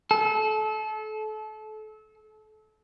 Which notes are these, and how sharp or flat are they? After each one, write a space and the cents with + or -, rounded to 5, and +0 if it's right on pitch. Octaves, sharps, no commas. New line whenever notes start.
A4 -30